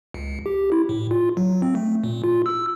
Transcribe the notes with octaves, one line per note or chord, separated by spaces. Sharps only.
C#2
G4
E4
A2
F4
F#3
C4
A3
A#2
F4
E6